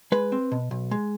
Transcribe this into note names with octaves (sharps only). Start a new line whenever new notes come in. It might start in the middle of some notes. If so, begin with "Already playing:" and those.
G#3 B4
C4
B2
B1
G#3